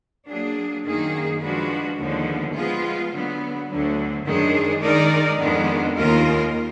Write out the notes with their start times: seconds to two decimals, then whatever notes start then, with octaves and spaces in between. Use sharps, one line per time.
0.27 F#3 A#3 D4 G#4
0.84 F#2 D#3 A#3 D#4 G#4
1.41 F3 G#3 D4 F#4 B4
1.98 D#2 D3 F3 G#3 B3
2.55 F3 G#3 B3 F4 G#4
3.11 D3 F#3 B3
3.68 D2 D3 F#3
4.25 F#2 D#3 G#3 D4 G#4
4.82 D#3 G#3 D#4 A#4 D5
5.39 F2 D#3 G#3 B3 D4
5.96 D#2 D#3 A#3 F4 A#4